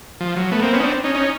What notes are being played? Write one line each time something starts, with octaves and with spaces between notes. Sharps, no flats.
F3
F#3
A3 B3
A#3 C4
B3 C#4
D#4
C4 D4
C#4 D#4
C#4 D#4